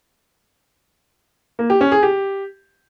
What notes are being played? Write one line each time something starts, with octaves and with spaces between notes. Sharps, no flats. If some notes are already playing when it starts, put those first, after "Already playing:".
A#3
G4
C#4
G#4
G4